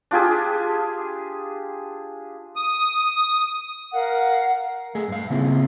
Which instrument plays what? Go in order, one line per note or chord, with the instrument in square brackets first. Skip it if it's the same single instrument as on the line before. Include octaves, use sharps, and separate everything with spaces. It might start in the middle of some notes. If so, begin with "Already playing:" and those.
[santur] D4 F4 G4 G#4
[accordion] D#6
[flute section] A#4 F5 F#5
[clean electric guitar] A3 G#4
G2 F5
C#3 A#3 C4 E4 F4 G#4